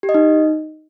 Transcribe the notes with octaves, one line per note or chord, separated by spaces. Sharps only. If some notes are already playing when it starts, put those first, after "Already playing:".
G4
D#5
D#4